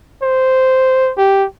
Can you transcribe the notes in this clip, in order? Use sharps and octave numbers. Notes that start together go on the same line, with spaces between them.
C5
G4